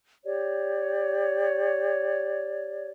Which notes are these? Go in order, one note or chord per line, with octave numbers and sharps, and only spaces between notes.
G4 C#5 D5